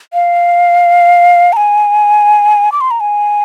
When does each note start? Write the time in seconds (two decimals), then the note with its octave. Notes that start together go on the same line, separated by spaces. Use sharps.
0.13 F5
1.53 A#5
1.57 G#5
2.72 D6
2.81 C6
2.91 A#5
3.00 G#5